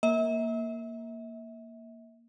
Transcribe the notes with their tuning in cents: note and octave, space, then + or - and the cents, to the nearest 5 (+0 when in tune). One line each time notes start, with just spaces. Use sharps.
A#3 +0 E5 -35